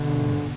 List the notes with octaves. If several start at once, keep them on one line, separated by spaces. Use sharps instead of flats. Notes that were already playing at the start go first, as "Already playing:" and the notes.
Already playing: B2 D3
F2
G2
G#2
B2